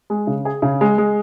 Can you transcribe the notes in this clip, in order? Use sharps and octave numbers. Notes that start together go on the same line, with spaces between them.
G#3
C#3
G#4
C#3
G#3
G#3